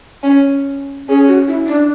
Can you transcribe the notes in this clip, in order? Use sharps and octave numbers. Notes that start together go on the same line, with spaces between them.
C#4
C#4 G#4
F#4
E4
D4